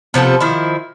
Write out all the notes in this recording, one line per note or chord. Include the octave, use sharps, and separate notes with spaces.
C3 F3 B3 A4
D#3 F3 E4